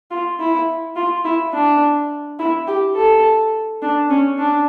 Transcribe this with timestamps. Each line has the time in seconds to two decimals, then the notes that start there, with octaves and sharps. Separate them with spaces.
0.11 F4
0.39 E4
0.96 F4
1.25 E4
1.53 D4
2.39 E4
2.67 G4
2.95 A4
3.82 D4
4.10 C#4
4.38 D4